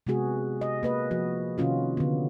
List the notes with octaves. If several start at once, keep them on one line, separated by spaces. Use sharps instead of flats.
C3 G#3 B3 F#4 G#4
D#5
A#3 B4 D#5
F3 F#4
C3 D#3 C#4 F4 F#4
D3 B3